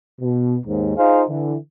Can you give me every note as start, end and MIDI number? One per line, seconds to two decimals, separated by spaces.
0.21 0.57 47
0.66 0.95 39
0.66 0.95 44
0.97 1.23 63
0.97 1.23 65
0.97 1.23 68
0.97 1.23 72
0.97 1.23 77
1.29 1.56 50
1.29 1.56 52